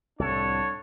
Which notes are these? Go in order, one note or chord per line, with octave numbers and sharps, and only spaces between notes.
C2 A2 D4 A4 C#5